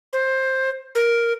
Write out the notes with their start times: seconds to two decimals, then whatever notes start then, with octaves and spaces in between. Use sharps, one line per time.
0.13 C5
0.95 A#4